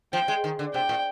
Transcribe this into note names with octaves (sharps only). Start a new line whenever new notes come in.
F3 G5
G#3
D#3
D3
C3 G5
A#2